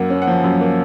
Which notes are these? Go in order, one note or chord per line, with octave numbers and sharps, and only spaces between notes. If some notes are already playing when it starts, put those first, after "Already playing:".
Already playing: F#2 A#3 F#5
C#4
F#5
F3
F#2
A#3